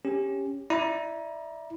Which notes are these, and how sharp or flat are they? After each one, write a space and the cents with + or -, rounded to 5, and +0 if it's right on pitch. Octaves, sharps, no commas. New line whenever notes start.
C#4 -5 G4 +10
E4 +0 D5 +15 A#5 +25